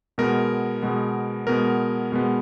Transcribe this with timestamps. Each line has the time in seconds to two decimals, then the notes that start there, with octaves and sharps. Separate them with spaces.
0.18 B2 G#3 B3 A#4
0.82 B2 G#3 B3
1.47 B2 G#3 B3 A#4
2.12 B2 G#3 B3